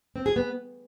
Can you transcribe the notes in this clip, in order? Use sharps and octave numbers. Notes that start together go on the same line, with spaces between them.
C4
G#4
B3